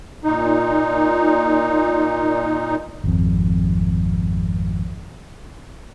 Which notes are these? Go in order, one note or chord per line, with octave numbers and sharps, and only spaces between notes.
A#2 D#4
G#1 F2